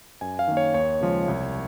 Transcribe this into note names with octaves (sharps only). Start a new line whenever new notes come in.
F#2 G#5
F5
D#3 A#3
C#5
D#2 C#5
C#3 F3 G#3
C2